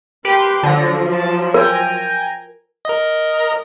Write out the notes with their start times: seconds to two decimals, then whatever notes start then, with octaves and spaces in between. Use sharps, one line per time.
0.25 G4 A#4 B4 G5 C6
0.63 D3 F3 F#3 A#6
1.13 A5
1.54 A#4 G5 G#5 A#5
2.85 A#4 D#5